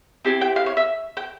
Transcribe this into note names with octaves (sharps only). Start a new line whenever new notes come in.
C4 E4 G4 G#5
G5
F5
C#5
E5
G5